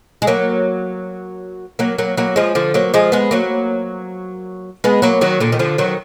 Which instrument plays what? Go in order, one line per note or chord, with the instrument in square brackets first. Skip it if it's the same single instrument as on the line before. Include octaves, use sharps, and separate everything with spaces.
[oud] G#3
F#3 A#3
F#3 A#3
F#3 A#3
F#3 A#3
F3 G#3
D3 F3
F#3 A#3
F3 G#3
G#3 B3
F#3 A#3
G#3 B3
F#3 A#3
D#3 F#3
A#2 D3
D#3
D3 F3
D#3 F#3